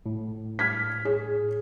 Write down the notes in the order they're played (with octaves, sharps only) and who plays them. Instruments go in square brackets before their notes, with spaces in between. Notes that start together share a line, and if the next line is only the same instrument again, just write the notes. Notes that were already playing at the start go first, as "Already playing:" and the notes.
[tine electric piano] A2
[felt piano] F6 G#6 B6
G#4 C#5